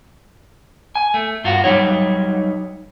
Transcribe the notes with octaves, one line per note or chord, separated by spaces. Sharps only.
G#5
A3
G2 F4 F#4
F#3 G3 D#4 C#5